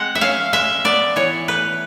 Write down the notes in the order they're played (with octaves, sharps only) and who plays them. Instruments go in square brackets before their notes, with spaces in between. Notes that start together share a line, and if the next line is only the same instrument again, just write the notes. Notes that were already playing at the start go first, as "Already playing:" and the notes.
Already playing: [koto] G#3 C4 F#5
E5
C#4 F5
G#3 E5
B3 D5
E3 C#5
A3 B4